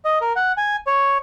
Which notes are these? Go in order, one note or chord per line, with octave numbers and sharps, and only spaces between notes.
D#5
A#4
F#5
G#5
C#5